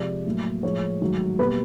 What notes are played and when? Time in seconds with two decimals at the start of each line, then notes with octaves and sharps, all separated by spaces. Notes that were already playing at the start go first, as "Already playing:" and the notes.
Already playing: C3 F3 G#3 D5
0.25 A2 F#3 A#3
0.63 A2 F3 G#3 C#5
1.01 G#2 D#3 F#3 A3
1.38 B2 G3 A#3 B4